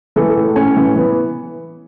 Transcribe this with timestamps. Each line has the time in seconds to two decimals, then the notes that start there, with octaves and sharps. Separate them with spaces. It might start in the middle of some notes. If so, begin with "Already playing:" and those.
0.16 E3 A3 A4
0.36 A2
0.56 A2 C#4 C#5
0.77 E3
0.96 E3 B3 B4